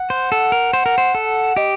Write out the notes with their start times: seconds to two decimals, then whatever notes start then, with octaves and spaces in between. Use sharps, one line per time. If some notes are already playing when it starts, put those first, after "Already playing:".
Already playing: F#5
0.10 C5
0.32 A4
0.52 A#4
0.73 C5
0.86 A#4
0.98 C5
1.15 A4
1.57 G4 D#5